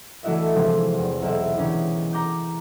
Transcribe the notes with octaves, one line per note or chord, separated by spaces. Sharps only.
E3 A3 E4 F#4 D#5 E5
C3 E3 F3 G#3 C4 G4
E2
B1 E5
D#3 E3 C#4 D#4
A#5 D6 G6